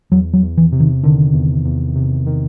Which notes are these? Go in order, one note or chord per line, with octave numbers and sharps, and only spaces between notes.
E2 F#3
F#3
E2
E3
C3
D#3
D3 D#3
E2
E2
C3
D#3